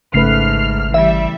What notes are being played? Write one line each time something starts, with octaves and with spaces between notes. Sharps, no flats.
G#1 G#2 C#3 A3 B4 F6 C7
E3 G3 E5